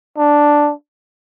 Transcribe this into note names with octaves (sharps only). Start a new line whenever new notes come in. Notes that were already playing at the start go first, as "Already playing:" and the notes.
D4